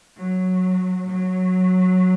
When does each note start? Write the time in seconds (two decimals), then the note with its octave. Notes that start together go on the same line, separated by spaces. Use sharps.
0.16 F#3
1.06 F#3